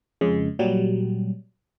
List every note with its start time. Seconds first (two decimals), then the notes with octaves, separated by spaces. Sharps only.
0.21 F2 C#3 G#3
0.59 A#2 F#3 G3